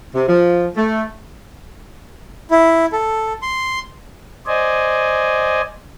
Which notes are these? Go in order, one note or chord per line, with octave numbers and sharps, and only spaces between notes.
C3
F3
A3
E4
A4
C6
C5 D5 D#5 G#5